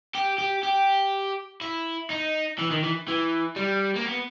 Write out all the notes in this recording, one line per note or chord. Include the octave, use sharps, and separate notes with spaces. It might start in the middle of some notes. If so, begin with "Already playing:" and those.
G4
G4
G4
E4
D#4
E3
D#3
E3
E3
G3
A#3
B3